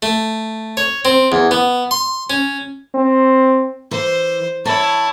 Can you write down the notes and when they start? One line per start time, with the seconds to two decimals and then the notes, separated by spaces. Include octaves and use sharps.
0.02 A3
0.77 C#5
1.05 C4
1.32 E2
1.51 B3
1.91 C6
2.30 C#4
2.94 C4
3.91 E3 C5
4.65 E4 C#5 A5